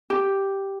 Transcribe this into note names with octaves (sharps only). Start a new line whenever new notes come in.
G4